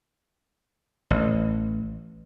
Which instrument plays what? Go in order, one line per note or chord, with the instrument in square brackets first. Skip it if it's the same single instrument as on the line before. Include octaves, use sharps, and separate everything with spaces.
[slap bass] A1